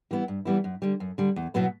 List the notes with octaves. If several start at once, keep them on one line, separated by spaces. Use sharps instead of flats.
E3 G3 B3 E4
G2
E3 G3 B3 E4
F#2
D3 G3
F#2
D3 G3
E2
B2 F#3 B3 E4